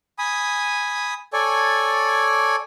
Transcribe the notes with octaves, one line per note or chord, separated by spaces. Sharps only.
G#5 B5 D#6
A4 C#5 D5 G#5